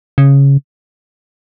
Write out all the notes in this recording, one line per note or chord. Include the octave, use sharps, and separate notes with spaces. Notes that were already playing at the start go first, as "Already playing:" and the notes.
C#3